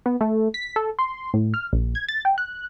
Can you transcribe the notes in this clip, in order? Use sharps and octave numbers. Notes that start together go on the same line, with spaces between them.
B3
A3
B6
A4
C6
A2
F6
A#1
G#6
A6
G5
F#6